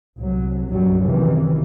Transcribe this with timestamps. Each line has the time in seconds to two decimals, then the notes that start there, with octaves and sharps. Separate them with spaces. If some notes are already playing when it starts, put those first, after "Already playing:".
0.17 C2 F#3
0.69 A#1 F#2 F#3 G3
1.01 F#1 C3 D#3 E3